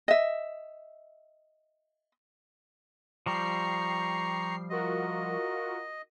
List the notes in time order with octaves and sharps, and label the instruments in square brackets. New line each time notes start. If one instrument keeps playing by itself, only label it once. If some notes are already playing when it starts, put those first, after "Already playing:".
[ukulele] D#5 E5
[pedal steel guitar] F3 G3 [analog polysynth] G5 C7 [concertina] A#5 C#6
[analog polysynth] F4 F#4 A#4 [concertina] D#5